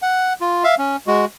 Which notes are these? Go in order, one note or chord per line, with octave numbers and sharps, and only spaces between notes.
F#5
F4
E5 F5
C#4
G#3 F#4